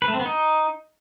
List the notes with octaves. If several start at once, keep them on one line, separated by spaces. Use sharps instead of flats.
B4
A3
C4
B3
D#4